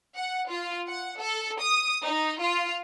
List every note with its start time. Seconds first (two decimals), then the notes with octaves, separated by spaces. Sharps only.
0.16 F#5
0.49 F4
0.87 F#5
1.19 A4
1.59 D#6
2.03 D#4
2.40 F4